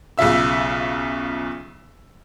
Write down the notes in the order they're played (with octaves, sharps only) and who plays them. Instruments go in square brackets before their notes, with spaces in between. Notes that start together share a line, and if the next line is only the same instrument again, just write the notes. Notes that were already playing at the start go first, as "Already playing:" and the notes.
[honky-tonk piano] B1 C#3 F4 E5 E6